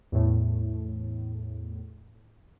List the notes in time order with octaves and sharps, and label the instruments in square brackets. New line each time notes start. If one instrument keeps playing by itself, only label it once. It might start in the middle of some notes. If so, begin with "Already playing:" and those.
[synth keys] E2 A2